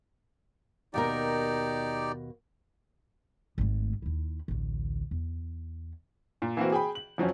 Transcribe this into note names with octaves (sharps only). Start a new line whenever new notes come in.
D#2 B2 D#4 G4 A#4 D5
G#1 A3
D#2 E4
A1 D2
E2
A#2
E3 A#3 C4 F#4
G#4 G5 B5
F#7
F2 F3 F#3 C#4